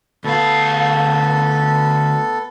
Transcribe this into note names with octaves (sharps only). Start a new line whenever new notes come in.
D2 B3 A4 F5